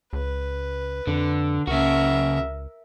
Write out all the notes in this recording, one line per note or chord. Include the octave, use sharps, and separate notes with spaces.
C#2 B4
F2 D3
C#2 C#3 F#4 A#4 E5